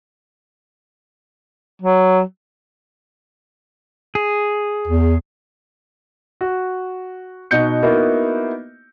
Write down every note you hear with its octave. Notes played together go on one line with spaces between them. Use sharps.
F#3
G#4
E2
F#4
B2 D#4 F#4 G6 C#7
A#3 B3 D#4 E4 F#4